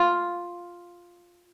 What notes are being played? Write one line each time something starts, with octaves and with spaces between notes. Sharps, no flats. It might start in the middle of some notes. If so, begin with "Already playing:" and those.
Already playing: F4